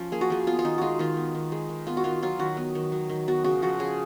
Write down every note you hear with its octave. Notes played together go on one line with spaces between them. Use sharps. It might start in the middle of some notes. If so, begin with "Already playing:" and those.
Already playing: F3 C#4
A#3 G#4
F#4
F3 G#4
B3 F4
F4
D#3 D#4
G#3 F4 F#4
D#3 F4
B3
D#3
G#3
D#3
B3 F4
F#4
D#3 F4
F#3 F4
D#3 F#4
B3
D#3
F#3
D#3
B3 F#4
C#3 F#4
F3 F#4
C#3 G#4